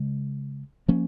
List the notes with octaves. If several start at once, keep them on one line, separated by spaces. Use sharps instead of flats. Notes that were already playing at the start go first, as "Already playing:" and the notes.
Already playing: C#3 G#3
F3 A#3 C#4